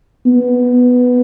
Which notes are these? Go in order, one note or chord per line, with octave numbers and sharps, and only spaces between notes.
B3